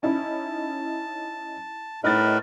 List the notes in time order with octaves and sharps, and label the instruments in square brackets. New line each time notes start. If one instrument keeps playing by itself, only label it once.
[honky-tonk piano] C#4 D#4 E4 [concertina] A5
[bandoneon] A2 [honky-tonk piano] D#4 A6 [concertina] A#4 B4